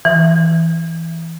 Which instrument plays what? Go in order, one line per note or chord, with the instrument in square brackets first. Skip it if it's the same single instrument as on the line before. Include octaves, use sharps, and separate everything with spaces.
[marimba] E3